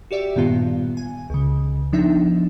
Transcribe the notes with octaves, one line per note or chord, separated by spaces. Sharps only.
F#4 G4 D5 E5 G5
G2 A#2 D#3 B3 F4
G#5
C#2 C#3
F3 B3 D4 D#4 E5